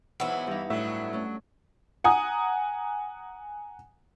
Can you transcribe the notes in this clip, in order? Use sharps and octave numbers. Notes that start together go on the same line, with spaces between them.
G#2 E3 F#3 B3 E4
G2 E3 D#4
A2 F#3 D4 E5
A3 C#4
F#5 G#5 A#5 D#6